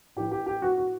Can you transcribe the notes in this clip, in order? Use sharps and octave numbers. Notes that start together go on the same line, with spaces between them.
A2 E3 G4
G4
G4
F#4
F#4